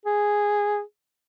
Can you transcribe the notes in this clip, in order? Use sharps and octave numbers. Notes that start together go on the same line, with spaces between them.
G#4